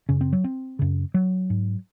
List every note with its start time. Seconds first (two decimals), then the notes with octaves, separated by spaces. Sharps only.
0.09 F#2 C#3 C#4
0.21 C4
0.33 F#3
0.44 C4
0.79 F#2 C#3
1.14 F#3
1.50 G#2